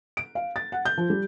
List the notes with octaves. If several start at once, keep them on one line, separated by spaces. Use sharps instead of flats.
D7
F5
A6
F#5
G6
F3
G3